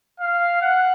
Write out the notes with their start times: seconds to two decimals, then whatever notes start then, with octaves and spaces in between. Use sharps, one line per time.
0.20 F5
0.62 F#5